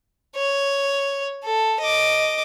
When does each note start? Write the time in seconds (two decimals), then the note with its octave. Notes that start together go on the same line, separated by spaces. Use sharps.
0.36 C#5
1.44 A4
1.80 D#5 D6